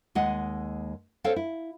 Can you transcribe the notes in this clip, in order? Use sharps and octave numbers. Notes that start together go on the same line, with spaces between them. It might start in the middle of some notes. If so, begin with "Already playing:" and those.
D#2 G#3 D#5 F#5
C4 A4 C5 C#5 F5 G5
E4